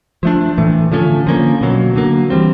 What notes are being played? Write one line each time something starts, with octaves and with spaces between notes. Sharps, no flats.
F3 A3 D4
A2 E3 A3
D3 F3 A3 C#4
D3 F3 A#3 C#4
B2 F#3 A#3
D3 F#3 A#3
E3 G3 C4